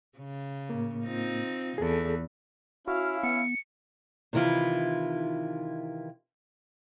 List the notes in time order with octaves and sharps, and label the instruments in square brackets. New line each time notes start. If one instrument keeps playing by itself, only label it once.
[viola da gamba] C#3
[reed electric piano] A2 A#3
[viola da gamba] C4 D#4 F4
[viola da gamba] E2 [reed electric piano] G#4 A4
[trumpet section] C#4 E4 F5 [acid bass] F#4 [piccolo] F6
[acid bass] B3 [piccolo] C#7
[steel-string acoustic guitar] C3 D#3 E3 E4 F4